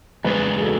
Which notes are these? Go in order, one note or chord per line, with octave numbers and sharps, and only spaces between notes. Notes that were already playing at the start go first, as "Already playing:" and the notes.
E2 C#3 G#3 D4 G#4 B4
G#4
F#4 A4